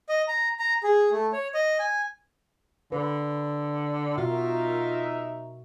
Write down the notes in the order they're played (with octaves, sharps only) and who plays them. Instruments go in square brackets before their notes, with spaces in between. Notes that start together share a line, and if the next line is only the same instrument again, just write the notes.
[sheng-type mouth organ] D#5
A#5
A#5
G#4
A3
C#5
D#5
G#5
[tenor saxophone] D3 [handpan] B4
[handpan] B2 F#4 [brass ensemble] D#4 A#4 E5 [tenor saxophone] F4